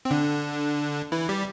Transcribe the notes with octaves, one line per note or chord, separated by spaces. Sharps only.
C4
D3 D4
E3 E4
G3 G4